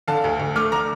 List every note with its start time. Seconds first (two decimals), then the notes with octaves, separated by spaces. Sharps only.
0.08 D3 F5 A5
0.24 D2
0.40 D2
0.56 A3 D6 F6
0.72 D3 A#5 D6